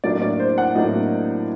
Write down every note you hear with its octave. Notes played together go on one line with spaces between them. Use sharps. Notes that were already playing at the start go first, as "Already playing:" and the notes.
A2 F#3 A#3 D4 D5
D5
C5
F#5
A2 F#3 A#3 D4 D#5